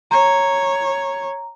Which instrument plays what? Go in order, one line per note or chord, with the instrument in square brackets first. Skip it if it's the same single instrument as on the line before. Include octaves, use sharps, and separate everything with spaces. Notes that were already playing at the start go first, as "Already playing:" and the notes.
[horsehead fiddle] C#5 [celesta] A#5